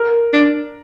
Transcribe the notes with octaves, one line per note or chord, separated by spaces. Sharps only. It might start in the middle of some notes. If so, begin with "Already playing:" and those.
Already playing: A#4
D4